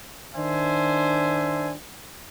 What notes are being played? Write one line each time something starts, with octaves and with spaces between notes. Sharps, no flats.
D#3 D4 C5 E5 G#5